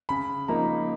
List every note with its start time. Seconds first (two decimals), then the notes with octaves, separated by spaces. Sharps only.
0.09 C#3 B5
0.48 F3 A#3 D#4 A#5